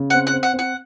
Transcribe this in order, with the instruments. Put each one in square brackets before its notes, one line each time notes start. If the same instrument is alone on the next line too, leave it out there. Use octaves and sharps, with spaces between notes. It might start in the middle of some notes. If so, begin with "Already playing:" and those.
Already playing: [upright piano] C#3
[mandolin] F#5
[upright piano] C4
[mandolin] F#5
[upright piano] C4
[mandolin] F#5
[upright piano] C4
[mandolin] F#5